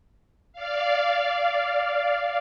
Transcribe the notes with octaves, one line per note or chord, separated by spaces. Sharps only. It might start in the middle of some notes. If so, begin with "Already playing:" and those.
D5 F5